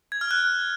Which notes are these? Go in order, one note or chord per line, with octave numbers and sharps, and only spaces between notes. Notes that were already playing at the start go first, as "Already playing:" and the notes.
G#6
F6
F#6